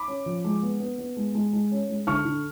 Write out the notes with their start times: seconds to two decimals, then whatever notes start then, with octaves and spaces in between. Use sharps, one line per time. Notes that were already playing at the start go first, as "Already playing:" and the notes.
Already playing: B5 D6
0.08 C#4
0.26 F3
0.44 G#3
0.63 B3
0.80 B3
0.98 B3
1.17 G#3
1.35 G#3
1.53 G#3
1.72 C#4
1.89 G#3
2.07 D3 C#6 F6
2.25 D3